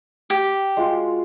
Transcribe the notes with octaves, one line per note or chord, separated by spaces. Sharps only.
G4
G#3 F4 F#4